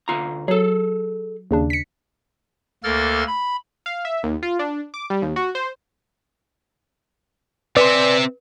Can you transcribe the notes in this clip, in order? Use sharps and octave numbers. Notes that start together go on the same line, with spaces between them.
D2 F4 A#5
F#3 G#4 A4
D#2 C#3 D4
B6 C#7
D2 A#3 A4 A#4 F6 A6
B5
F5
E5
D#2
F4
D4
D6
G3
D#2
F#4
C5
C4 B4 D5 E5 G#5 C6